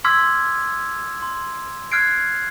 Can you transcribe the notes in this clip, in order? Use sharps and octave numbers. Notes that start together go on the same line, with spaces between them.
C6 D6 E6 F6 G#6 B6
C6
F6 F#6 G#6 C7 D7